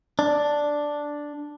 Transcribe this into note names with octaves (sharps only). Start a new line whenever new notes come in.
D4